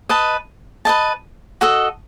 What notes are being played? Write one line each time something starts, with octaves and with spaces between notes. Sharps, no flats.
B4 D#5 A5
B4 D#5 A5
F#4 A4 D#5